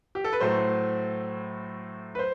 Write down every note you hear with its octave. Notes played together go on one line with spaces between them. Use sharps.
G4
A4
B4
A2 F#3 A3 C5
B4
C5